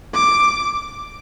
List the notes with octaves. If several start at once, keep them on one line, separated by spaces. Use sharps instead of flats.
D6